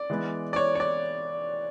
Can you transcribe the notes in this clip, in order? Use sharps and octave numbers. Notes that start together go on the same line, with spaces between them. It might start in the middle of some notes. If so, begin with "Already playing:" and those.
Already playing: D5
E3 G#3 B3
D5
C#5
C#5
D5